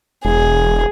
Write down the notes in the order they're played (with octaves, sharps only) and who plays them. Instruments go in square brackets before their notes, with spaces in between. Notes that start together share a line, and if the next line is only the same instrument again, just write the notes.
[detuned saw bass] E1 [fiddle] G#4